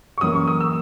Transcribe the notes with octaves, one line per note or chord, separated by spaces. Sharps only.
C#6
F#2 E3 A#3 D#6
C#6
D#6
E6